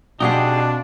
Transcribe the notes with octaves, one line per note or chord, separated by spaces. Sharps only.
B2 C4 D4 D#4 G4 G#4 F5 F#5